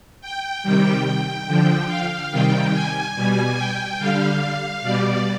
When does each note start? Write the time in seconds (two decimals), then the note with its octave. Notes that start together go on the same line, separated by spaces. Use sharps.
0.21 G5
0.63 C3 D#3 G3 G5
1.05 G5
1.47 D3 F3
1.88 F5
2.31 C3 D#3 G3 G5
2.73 G#5
3.15 B2 G3
3.57 G5
3.99 D3 G3 F5
4.82 B2 G3 D5